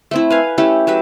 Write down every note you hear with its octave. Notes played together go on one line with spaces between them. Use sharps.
A3 C4 E4
B4 F5 G#5
A3 C#4 E4 G4
F#3 G4 B4 E5